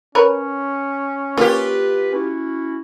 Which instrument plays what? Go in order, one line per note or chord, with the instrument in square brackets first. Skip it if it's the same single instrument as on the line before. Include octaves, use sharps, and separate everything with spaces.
[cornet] C#4 [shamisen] A#4 B4 C#5
[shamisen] A#3 [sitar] F4 G4 [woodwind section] B4
[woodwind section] C#4 E4 F#4